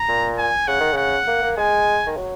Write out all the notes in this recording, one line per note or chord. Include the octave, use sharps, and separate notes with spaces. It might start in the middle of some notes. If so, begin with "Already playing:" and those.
Already playing: A#5
A#2
G#5
C#3 F#5
D#3
C#3 F#5
A#3
A#3
G#3 G#5
D#3
F#3